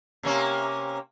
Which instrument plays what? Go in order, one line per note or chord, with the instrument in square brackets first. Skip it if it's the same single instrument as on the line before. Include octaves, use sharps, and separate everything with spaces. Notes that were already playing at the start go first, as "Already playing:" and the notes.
[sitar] C3 A#3 C#4